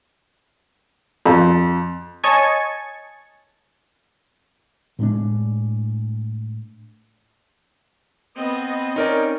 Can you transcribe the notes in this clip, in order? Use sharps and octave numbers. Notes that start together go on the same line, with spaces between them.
F2
C#5 D#5 G#5 A5 C#6 G#6
A2 G#3 C4 D4
B3 C4 D#5
C#4 D#4 A#4 D5